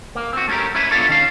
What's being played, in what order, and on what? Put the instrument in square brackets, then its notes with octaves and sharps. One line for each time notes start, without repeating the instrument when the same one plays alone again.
[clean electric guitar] A#3
C4 F#4
A3 C#4 D#4 G4 A#4
C#4 E4 B4
B3 D4 D#4 F4 A4 C#5
D#3 C#4 F5